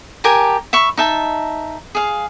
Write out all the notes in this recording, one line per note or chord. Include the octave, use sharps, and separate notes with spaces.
G4 A#4 G#5 A5
E5 B5 C#6
D#4 E5 A5
G#4 F5